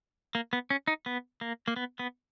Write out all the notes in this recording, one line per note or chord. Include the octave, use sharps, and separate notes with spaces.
A#3
B3
C#4
D#4
B3
A#3
A#3
B3
B3